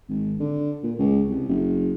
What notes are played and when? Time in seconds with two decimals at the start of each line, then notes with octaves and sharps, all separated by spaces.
0.09 G#1
0.40 D3
0.83 A#2
0.99 C#2
1.29 C2
1.48 F#1